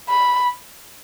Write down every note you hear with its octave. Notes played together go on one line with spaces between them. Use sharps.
B5